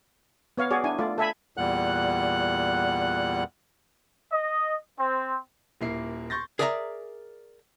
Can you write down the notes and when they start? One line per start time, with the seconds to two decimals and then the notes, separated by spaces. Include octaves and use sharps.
0.58 B3 C#5 F5
0.71 F#4 G#4 C#5 D5
0.84 D4 E4 G#5
0.98 A3 F4 D5
1.18 A4 E5 G#5 B5
1.57 E2 A#2 G3 F#5 F#6
4.32 D#5
4.98 C4
5.81 D#1 A#3 E4 C7
6.30 C6 C#6 G6 A6 A#6
6.59 G#4 A#4 D5 E5 F5 A#5